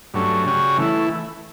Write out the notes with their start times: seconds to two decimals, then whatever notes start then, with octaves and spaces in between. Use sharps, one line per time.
0.14 G2 F#3 A3 C#4
0.46 C#3 G3 C#4 F#4
0.77 E3 A3 E4